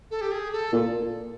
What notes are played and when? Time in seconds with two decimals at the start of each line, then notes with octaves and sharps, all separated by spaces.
0.11 A4
0.21 G4
0.32 G#4
0.52 A4
0.72 A#2